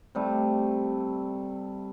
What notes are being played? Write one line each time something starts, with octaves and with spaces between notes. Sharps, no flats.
C3 G3 A3